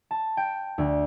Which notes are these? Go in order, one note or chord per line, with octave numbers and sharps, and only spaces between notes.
A5
G5
D2